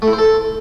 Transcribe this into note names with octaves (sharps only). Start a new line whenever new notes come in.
A3
E4
C5
A4